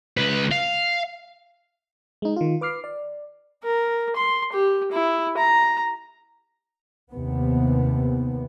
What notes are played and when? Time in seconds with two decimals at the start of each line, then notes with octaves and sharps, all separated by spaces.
0.17 C#2 B4
0.51 F5
2.22 G#3 D#4
2.36 D#3 F4
2.61 B4 D6 F6 C7
2.84 D5
3.64 A#4
4.16 C6
4.52 G4
4.92 E4
5.37 A#5
7.11 D#2 C3 B3